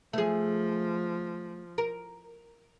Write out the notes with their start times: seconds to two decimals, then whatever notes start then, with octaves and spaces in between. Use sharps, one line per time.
0.13 F3 A3 G#4
1.78 A#4